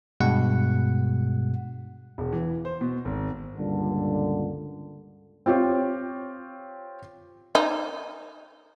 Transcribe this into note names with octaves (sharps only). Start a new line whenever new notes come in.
G2 B2 G#3 F#5
E1
E3
C5
B2
G#1
C#2 G2 A#2 D3
C4 F4 G4 C#5
D#4